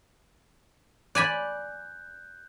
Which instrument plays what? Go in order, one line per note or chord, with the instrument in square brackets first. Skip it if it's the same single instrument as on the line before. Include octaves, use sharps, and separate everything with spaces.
[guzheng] D5 G#5 B5 [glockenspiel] F#6 G6